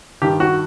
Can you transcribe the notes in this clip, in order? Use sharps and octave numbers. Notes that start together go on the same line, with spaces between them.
G2 D#3 G4
F#4